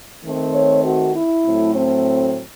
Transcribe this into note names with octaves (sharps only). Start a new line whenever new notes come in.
D#3 A3 C4
C#5
F#4
E4
A2 F#3 A3 C4
C4